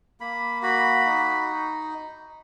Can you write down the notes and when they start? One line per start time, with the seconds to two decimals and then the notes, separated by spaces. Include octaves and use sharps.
0.20 A#3 B5
0.62 F#4 B5
1.06 D#4